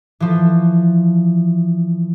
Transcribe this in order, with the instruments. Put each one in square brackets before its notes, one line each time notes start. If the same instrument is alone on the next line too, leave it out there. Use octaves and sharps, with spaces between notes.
[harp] E3 F3